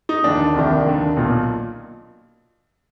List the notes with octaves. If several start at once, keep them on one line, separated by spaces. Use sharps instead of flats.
D#4
D#2 D3 D4
C2 C3 D#3
D#2 D3
B1 A#2